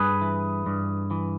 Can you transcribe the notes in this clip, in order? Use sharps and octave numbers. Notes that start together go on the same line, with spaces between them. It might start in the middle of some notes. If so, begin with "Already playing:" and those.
Already playing: G2 G#4 B4
E3
G2
E3